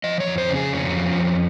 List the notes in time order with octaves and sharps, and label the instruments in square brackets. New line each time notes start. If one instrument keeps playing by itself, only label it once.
[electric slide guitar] F3 D#5
C#5
F2
C5
C#3
G#4
F2 C#4
F3
F2